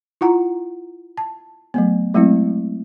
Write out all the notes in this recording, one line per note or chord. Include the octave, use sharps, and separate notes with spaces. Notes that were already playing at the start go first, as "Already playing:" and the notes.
E4 F4 F#5 A#5
A5
F#3 A3 B3
F#3 G#3 A3 C4 E4